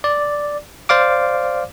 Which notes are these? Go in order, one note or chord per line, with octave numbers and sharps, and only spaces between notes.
D5
C5 D5 F5 D6